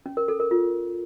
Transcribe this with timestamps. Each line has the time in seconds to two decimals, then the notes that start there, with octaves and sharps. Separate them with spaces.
0.06 C#4
0.17 A#4
0.28 A4
0.40 A#4
0.51 F4